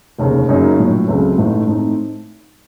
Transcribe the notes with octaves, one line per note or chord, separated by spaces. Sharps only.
F1 D#2 C#3
F#2 C#3 F#3 A#3 D#4
A#1 A2 F#3
C#2 C#3 F#3 A3 C4
A1 A2 A3 D#4
A2 A3 C4 D#4